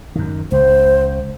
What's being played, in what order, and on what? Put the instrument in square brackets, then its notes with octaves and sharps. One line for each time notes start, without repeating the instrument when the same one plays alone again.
[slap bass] F#2 D#3
[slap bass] C#2 [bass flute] C5